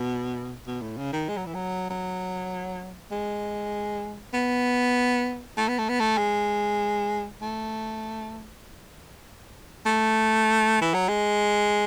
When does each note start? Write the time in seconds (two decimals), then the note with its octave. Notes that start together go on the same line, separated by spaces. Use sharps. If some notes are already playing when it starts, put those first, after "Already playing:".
Already playing: B2
0.67 B2
0.82 A2
0.98 C#3
1.13 D#3
1.29 G#3
1.37 F#3
1.46 E3
1.55 F#3
1.90 F#3
3.12 G#3
4.34 B3
5.57 A3
5.68 B3
5.79 A3
5.89 B3
6.00 A3
6.18 G#3
7.41 A3
9.86 A3
10.81 E3
10.94 F#3
11.09 G#3